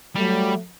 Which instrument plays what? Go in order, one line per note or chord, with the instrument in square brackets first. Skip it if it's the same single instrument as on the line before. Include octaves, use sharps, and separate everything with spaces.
[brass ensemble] F#3 A3 [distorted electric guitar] G3